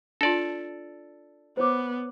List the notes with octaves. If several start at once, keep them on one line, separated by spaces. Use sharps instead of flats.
D4 F4 A4 D5
B3 C5 C#5 D6